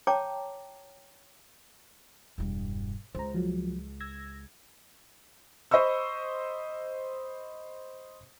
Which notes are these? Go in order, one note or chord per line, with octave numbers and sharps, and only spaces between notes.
C#5 G5 A5 A#5 D6
E1 G2
C#2 C5 A#5
F3 F#3
E6 G#6 A#6
C5 D#5 B5 C#6 E6